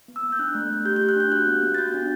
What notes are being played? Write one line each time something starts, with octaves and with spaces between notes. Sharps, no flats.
B3
E6
B3
G6
D4 F#6
A3
A3
G4 G6
G4 G6
F#6
D4 G6
F#4 F#6
B3
B3
A6
F#4 G6
D4